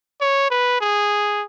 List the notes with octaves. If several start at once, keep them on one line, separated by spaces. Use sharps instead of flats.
C#5
B4
G#4